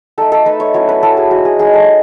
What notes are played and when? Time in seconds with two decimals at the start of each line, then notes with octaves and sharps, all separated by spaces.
0.18 A3 D#4 A4
0.32 A4
0.46 A3 D#4 B4
0.60 C#5
0.74 F#3 C#4 E4 C#5
0.89 B4
1.03 F#3 C#4 E4 A4
1.17 G#4
1.31 G#3 D#4 F#4
1.45 G#4
1.59 G#3 D#4 G#4
1.74 A4